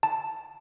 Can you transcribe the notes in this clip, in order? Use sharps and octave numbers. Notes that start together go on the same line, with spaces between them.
A5